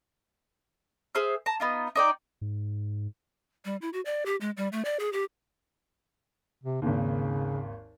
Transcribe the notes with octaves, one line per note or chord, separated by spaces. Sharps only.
G#4 C5 E5 F6
A5 A#5
B3 D#4 F4
D#4 D5 G5
G#2
G3
E4
F#4
D5
G4
G#3
G3
A3
D5
G#4
G4
C3
G#1 D#2 C#3